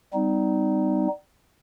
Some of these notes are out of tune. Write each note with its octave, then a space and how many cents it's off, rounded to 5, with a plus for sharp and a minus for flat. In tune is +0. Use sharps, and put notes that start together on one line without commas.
G3 +5 C4 -45 D#4 +0